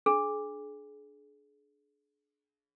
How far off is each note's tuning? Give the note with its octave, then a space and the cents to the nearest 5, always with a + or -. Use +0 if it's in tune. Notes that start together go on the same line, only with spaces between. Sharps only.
D4 +0 G#4 +35